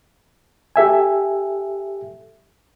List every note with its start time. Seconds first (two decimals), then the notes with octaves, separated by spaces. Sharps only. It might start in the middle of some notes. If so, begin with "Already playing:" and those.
0.76 G4 A4 E5 G#5